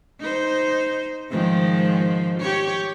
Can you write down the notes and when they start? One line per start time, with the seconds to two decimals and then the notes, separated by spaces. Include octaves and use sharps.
0.20 D#4 C5
1.30 G#2 D#3 F3
2.40 G4 C#5